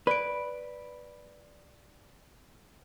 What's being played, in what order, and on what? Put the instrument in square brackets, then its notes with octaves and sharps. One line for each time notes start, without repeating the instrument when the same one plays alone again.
[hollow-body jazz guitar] B4 [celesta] D5 D7